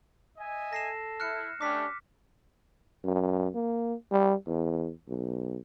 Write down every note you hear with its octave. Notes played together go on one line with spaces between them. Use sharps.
D#5 E5 G#5
A4 A#6 C7 E7
E4 F6 F#6 C#7
A3 C#4 D4 G4 D6 B6
F#2
A#3
G3
E2
B1